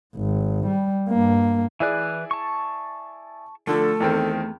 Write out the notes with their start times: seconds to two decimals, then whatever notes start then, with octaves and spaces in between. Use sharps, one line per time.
0.16 G#1
0.67 G3
1.09 G2 A#3
1.80 E3 E4 G#4 B4 D5 F#6
2.31 A5 C#6
3.67 D3 F3 A3 A4
4.00 E2 D#3 C4